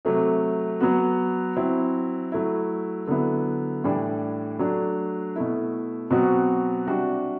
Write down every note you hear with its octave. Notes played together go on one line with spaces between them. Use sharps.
C3 F#3 A3
F#3 B3 F#4
F#3 C4 E4
F#3 A3 E4
D3 F#3 B3 E4
A2 E3 G3 D4
F#3 A3 D4
B2 A3 E4
B2 F#3 C4 F#4
C3 G3 D4 F#4